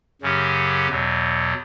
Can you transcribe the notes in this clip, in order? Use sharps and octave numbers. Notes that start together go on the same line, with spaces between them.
F#2 C#3 F#3 C#4 G4
E2 B2 F#3